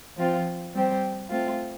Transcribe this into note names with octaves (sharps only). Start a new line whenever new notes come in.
F3 C4 F4
G3 C4 G4 C5
A3 C4 F4